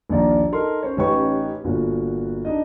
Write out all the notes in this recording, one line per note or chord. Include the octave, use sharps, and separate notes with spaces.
A#1 D#2 D5 A#5
D#4 A4 A#4 C6
C#4 C5 C#5
A1 C#4 D#4 G4 B4 C#6
G1 A#2 F#4
D4 D#4 D#5